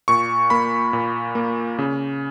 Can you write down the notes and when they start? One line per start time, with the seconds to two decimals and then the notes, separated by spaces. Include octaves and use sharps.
0.08 A#2 C#6
0.50 A#3 B5
0.93 A#2
1.35 A#3
1.79 C#3